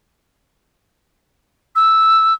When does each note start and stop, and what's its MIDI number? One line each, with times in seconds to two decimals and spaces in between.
1.76 2.34 88